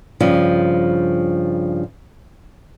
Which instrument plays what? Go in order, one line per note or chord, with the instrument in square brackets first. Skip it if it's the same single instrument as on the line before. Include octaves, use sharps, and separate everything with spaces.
[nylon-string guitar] G2 C#3 F3